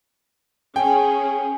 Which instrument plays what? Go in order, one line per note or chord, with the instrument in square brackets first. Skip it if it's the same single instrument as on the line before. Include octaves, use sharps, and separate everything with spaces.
[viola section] C#4 G#4 [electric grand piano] G5 [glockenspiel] G#5